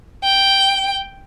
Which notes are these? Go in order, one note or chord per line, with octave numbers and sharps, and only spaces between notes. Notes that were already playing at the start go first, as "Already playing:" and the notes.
G5